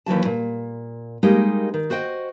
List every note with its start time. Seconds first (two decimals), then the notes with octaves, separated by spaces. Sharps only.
0.06 D#2 E3 F#3 A5
0.25 A#2
1.23 G3 G#3 A#3 D#4 G4
1.74 D#3
1.90 F#4 C5 D#5 G5